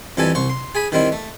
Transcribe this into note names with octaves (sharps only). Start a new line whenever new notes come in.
F2 E3 G3 A4 G#5
C2 C5 C#6
C6
G#4 G#5 B5
D#3 G3 C4 E4
A3